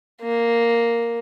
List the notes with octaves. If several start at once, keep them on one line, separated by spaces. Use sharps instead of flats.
A#3